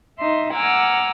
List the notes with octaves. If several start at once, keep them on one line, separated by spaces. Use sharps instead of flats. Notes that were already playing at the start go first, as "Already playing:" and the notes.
D#4 E5 C6
F#5 G#5 A#5 D6 E6 F6